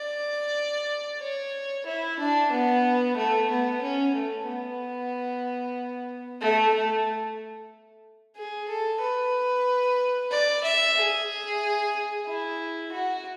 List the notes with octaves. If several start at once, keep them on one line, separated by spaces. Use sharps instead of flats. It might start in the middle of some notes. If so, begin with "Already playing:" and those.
Already playing: D5
C#5
E4
D4
B3
A3
B3
C#4
A3
B3
A3
A3
G#4
A4
B4
D5
E5
G#4
E4
F#4